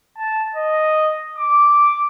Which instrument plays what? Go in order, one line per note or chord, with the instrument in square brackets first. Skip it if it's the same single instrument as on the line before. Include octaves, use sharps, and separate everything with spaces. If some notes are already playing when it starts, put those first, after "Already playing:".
[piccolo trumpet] A5
D#5
D6